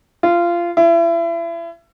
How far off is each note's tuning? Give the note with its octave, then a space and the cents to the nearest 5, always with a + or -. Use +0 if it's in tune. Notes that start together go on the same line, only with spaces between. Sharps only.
F4 -20
E4 +35